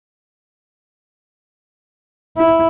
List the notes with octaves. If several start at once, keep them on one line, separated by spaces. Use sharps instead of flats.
E4